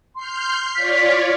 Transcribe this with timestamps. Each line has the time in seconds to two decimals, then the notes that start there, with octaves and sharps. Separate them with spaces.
0.16 C6 F6 G6 C7
0.76 F4 C#5 D5 B6